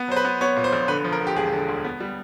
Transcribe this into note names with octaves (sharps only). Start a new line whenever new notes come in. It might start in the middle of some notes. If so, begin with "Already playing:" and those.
Already playing: B3
F#3 C5
B4
B3
B3 C#5
A#2
C5
A#1
D3 B4
F3
A#4
D3
G4
E1 G#4
D3
D2
B3
G3